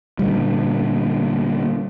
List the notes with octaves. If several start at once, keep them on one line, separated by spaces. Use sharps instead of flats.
A#2 D3 G3